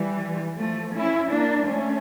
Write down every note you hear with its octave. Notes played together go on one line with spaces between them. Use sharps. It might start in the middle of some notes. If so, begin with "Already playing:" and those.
Already playing: E3 G3
F3 A3
C#4 E4
A#3 D4
A3 C#4